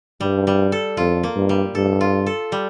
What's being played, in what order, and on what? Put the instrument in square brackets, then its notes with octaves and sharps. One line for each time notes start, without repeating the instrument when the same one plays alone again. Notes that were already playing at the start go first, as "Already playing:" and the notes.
[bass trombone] G2 [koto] G3
[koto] G3
A4
[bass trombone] F2 [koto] F4
[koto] A#3
[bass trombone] G2
[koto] G3
[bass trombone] G2 [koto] A4
[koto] F4
A4
G3